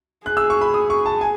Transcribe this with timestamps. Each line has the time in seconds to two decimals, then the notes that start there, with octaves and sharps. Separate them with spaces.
0.25 G#4 F#6
0.37 E6
0.50 C#6
0.61 B5
0.74 D#6
0.90 C#6
1.06 A5
1.21 G#5